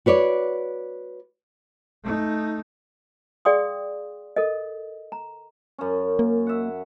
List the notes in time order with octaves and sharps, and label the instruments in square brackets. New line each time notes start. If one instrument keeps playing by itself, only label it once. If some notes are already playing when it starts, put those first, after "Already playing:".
[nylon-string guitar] F#4 B4 C#5 D5
[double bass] A3 D#4
[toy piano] G#4 D5 F5 G5 C6 D#6
A4 A#4 D#5
A#5
[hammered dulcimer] F#2 C#4
[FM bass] A#3
[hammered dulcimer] E5 F#5